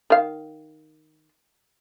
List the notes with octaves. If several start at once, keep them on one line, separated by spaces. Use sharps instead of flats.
D#3 F5